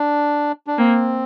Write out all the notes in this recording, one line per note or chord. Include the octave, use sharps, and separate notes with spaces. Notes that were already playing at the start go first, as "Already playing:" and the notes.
Already playing: D4
D4
A#3 C4